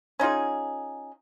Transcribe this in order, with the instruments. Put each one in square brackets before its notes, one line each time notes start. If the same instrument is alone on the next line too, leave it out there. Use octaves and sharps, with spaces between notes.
[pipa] C#4 D#4 F4 G#4